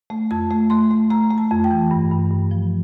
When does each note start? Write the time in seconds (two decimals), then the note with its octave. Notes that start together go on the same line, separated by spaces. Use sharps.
0.10 A3
0.31 F2 A5
0.50 A3
0.70 A3 C6
0.91 A3
1.11 A3 A#5
1.31 A3
1.38 A5
1.51 F2
1.64 G5
1.71 E3
1.91 G2
2.11 G2
2.31 G2
2.51 F3